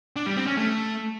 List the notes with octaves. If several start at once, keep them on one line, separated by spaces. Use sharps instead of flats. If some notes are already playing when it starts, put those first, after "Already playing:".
D4
G3
C4
C#4
A3